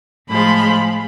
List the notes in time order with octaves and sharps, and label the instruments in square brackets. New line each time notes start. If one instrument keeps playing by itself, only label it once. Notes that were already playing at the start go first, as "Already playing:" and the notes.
[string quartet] A2 F3 G#3 B5